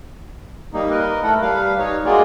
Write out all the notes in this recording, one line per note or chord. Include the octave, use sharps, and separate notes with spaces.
G3 A#3 D#4
A#4 B4 D#5
A3 E4 A4 A#4 F#5
G3 B4 F5
D#4 C#5
G#3 A#3 F4 F#4 G#4 D5